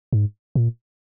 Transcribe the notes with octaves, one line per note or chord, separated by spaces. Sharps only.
G#2
A#2